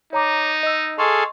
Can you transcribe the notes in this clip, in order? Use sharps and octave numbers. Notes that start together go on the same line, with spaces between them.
D#4 C#5 A#5 D6
D#5 E6
G#4 A4 D#5 F5 C6 C#6